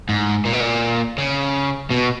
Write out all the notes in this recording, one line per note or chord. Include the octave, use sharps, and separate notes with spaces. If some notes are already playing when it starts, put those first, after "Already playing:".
G#2
A#2
B2
A#2
C#3
B2